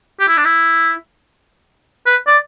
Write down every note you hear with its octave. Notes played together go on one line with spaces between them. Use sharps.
G4
E4
D4
E4
B4
D5